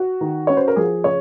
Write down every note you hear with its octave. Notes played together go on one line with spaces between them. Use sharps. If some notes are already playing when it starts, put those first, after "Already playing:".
Already playing: F#4
D#3
C#4 C#5
C5
A#4
F3 G#4
C#3 C#5